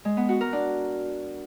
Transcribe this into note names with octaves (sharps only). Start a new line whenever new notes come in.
G#3
B3
F#4
A#4
D4